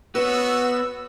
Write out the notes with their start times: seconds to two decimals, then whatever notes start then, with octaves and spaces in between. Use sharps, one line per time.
0.15 B3 F#4 B4 C#5 E6